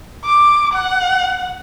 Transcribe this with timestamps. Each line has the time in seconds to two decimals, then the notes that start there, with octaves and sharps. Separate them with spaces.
0.24 D6
0.73 F#5